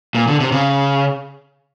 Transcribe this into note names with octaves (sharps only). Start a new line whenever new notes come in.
A#2
D3
C3
C#3